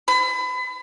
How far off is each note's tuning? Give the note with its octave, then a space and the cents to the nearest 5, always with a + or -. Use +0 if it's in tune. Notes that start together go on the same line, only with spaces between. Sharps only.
B5 +35